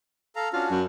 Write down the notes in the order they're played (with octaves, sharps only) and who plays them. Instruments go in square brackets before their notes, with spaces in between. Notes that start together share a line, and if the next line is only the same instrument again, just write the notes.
[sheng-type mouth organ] A4 F5 A#5
[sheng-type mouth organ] C#4 D4 F#4 [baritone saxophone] F4
[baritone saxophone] F#2